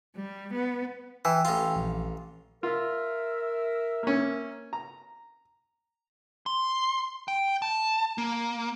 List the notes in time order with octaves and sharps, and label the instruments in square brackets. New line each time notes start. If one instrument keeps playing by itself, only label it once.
[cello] G3
B3
[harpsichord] E3 [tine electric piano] G5 G#5 E6
[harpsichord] A1 F4
[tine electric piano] A#1
[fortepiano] F4 [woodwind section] A#4 E5
[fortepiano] A#3 C#4
A#5
[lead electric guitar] C6
G5
A5
A#3